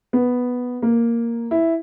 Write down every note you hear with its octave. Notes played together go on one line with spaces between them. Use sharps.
B3
A#3
E4